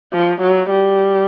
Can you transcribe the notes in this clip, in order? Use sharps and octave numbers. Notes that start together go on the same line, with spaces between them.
F3
F#3
G3